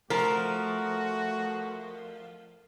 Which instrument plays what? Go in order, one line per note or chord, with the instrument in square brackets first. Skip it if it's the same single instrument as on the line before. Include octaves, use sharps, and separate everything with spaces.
[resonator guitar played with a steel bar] F3 [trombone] A3 [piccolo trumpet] F#4 [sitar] A#4